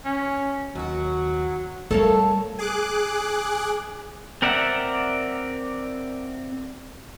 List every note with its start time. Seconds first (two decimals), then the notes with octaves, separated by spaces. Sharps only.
0.05 C#4
0.75 D#2 F#3 F#4
1.91 G3 A3 A4 A#4 C#5 F5 A5
2.58 G#4 D6 F#6
4.42 C4 A#4 D5 E5 F#5